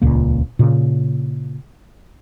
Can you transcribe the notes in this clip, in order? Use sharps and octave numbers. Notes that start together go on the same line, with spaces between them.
D#1 C#2 A#2 A#3
A#2 C#3